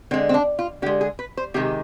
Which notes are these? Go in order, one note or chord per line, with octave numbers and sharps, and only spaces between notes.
D3 G#3 C4
C4
D4
F4
D3 G#3 G4
G#4
B4
C5
C3 D#3 G#3 G4